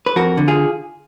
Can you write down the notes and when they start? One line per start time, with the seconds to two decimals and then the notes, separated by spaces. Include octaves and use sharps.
0.06 B4
0.16 F2 F#4 A#4
0.37 D3
0.48 F4 G#4